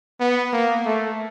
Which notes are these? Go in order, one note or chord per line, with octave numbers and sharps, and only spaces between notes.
B3
A#3
A3